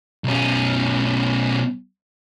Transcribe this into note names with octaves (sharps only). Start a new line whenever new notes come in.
B1 C#4